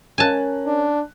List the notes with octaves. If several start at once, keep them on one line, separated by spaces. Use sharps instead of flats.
C#4 A#4 G#5 A5 F#6
D4